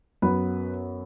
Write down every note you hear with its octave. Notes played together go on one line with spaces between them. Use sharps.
F#2 F#3 B3 B4